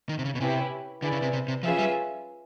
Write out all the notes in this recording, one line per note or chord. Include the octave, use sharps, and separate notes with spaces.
D#3
C3
C#3
B2
C3 C#4 E4 G4 B4
D3 E4 G#4 B4 D5
C#3
C3
C3
C3
F3 C#4 F4 G#4 B4 E5
G3